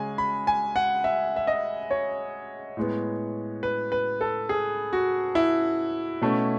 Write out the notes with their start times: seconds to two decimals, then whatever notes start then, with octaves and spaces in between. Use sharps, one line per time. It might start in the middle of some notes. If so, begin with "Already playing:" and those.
Already playing: C#3 G#3 C#4 G#5
0.18 B5
0.47 G#5
0.76 F#5
1.04 E5
1.36 E5
1.47 D#5
1.91 C#5
2.77 A2 G#3 B3
3.63 B4
3.92 B4
4.21 A4
4.49 G#4
4.93 F#4
5.35 E4
6.22 B2 A3 C#4